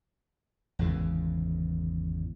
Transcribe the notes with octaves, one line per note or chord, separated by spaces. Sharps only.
G#1 E2 C#3 E3